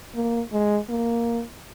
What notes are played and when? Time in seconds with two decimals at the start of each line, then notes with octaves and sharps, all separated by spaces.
0.15 A#3
0.52 G#3
0.90 A#3